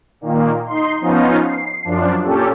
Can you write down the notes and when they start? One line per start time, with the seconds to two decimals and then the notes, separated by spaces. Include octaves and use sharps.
0.21 A#2 D#3 A#3
0.66 D#4 C6
1.01 F3 B3 C#4 D#4 F4
1.46 C7
1.84 F#2 F3 D4
2.23 A#2 C#4 G4 A4